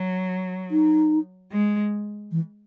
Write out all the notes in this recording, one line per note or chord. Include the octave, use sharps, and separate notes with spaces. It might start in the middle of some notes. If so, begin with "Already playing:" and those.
Already playing: F#3
D#4
G#3
E3